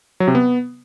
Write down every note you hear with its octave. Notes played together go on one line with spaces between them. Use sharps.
F#3
C3
B3